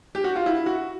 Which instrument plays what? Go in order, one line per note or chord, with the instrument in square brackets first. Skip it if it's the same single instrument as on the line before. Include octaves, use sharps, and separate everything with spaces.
[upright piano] G4
F#4
F4
E4
F#4